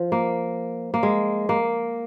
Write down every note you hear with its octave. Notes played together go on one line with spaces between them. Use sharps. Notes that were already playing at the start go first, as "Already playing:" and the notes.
Already playing: F3
A#3
A#3
G#3
A#3